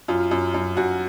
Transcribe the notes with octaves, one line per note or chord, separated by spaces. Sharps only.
F#2 F4
F#2
F#2
F#2 F#4